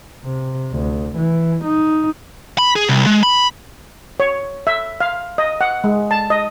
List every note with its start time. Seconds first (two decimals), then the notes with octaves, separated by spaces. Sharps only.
0.24 C3
0.73 D2
1.17 E3
1.64 D#4
2.59 B5
2.76 G#4
2.89 C2
3.06 G#3
3.23 B5
4.20 C#5
4.67 E5
5.01 F5
5.38 D#5
5.61 F#5
5.84 G#3
6.11 A5
6.30 D#5